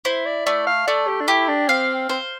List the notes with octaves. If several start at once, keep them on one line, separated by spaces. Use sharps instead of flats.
E4 C5
D5
A3 D5
F5
A3 D5
G4
D4
E4 G4
D4
C4 F5
C4 C5